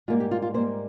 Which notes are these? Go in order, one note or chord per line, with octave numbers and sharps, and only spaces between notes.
G#2 G3 A#3 F4
G4
F4
F4
G#2 G3 A#3 C5